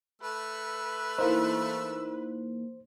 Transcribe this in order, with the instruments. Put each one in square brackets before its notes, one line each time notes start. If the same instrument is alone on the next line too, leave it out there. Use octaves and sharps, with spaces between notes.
[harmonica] A3 E6 [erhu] B4
[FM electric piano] E3 A#3 D#4 [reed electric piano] C5